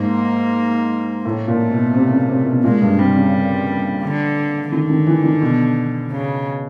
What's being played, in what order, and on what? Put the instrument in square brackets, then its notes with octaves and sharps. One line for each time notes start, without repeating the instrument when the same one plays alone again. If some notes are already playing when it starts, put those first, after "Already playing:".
Already playing: [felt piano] G#2 [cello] A#3
[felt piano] A2 [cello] A3
[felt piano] A#2
B2
C3
C#3
C3
B2
[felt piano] A#2 [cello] G#3
[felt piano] G2
[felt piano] C3 [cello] G3
[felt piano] C#3
[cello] D3
[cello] D3 [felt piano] D#3
[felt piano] D#3
E3
D#3
B2
[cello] C#3